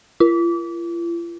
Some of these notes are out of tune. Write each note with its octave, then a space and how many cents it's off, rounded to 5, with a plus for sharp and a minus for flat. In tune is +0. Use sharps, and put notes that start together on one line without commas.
F4 -45